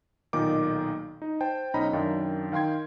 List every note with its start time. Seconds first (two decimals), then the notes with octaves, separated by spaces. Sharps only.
0.33 B1 A#2 D#3 D#4 D6
1.22 D#4
1.41 C5 G5 A5
1.74 B1 C#4 D#4 D#5 A#5 B5
1.93 F#2 D#3 D4 F5 G5
2.52 D#3 F5 G5 C6 G#6